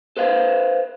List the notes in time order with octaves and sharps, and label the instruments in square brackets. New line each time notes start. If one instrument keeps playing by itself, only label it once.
[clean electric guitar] A4 B4 C5 F5